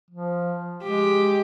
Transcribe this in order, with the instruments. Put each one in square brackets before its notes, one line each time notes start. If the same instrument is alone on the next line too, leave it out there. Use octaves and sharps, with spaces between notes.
[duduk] F3
[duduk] G#3 [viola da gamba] G4